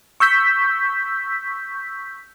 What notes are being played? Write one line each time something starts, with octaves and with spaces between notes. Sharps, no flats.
C#6 E6 G6 B6